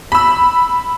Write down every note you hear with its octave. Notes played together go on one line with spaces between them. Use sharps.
B5 E6